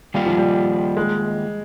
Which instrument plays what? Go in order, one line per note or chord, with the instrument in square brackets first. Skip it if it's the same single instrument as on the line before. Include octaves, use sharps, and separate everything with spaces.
[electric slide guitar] D#3 A#3 F4 [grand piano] G3
[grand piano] F3
G3
G#3